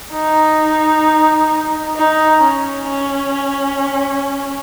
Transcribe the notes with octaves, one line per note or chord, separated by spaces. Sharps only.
D#4
D#4
C#4
C#4